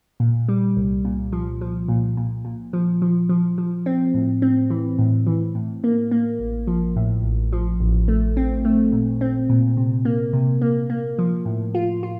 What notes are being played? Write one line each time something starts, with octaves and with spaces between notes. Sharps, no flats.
A#2
G3
C2
A#2
F3
F3
A#2
A#2
A#2
F3
F3
F3
F3
C4
A2
C4
E3
A2
E3
A2
A#3
A#3
A1
F3
A2
A1
F3
A1
A3
C4
A3
A#2
C4
A#2
C3
A#3
C3
A#3
A#3
F3
A2
F4
F4